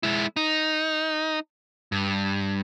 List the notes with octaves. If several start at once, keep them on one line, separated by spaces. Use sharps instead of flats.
G#3 E4
D#4
G2